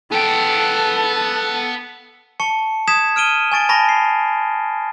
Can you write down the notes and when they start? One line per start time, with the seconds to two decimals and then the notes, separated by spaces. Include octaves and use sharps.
0.12 B3 A4 G5
2.40 A5 C#6 C#7
2.87 D#6 G#6 B6 E7
3.16 F6 D7 D#7 G7
3.52 G#5 C#6 A6 D7
3.69 A5 B5 C#6 A#6
3.89 C7